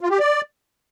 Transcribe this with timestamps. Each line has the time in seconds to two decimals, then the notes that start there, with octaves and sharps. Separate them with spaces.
0.01 F4
0.10 G4
0.19 D5